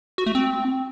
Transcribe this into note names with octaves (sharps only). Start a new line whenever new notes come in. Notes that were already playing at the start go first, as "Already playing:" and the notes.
F#4
A3
C4